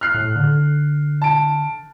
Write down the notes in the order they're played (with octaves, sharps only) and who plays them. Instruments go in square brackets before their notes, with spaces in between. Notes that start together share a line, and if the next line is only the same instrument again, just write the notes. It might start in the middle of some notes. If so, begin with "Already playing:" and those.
[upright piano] F6 F#6 C7
[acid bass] A2
D3
[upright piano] A5 D7